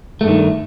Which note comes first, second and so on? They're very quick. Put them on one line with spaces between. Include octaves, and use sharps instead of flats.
A3 G2 D#3